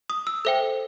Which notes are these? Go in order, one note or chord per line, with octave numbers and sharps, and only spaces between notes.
D#6
E6
A4 C5 E5 G5